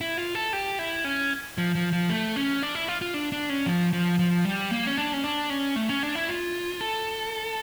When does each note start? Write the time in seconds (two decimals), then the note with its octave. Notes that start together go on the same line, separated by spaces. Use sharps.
0.01 E4
0.17 F4
0.35 A4
0.53 G4
0.79 E4
1.05 C#4
1.58 F3
1.75 F3
1.93 F3
2.10 A3
2.36 C#4
2.63 D4
2.75 E4
2.88 F4
3.01 F4
3.14 D4
3.32 D4
3.49 C#4
3.66 F3
3.93 F3
4.19 F3
4.45 G3
4.71 A#3
4.87 C#4
4.98 D4
5.13 C#4
5.24 D4
5.50 C#4
5.76 A3
5.89 C#4
6.03 D4
6.15 E4
6.29 F4
6.81 A4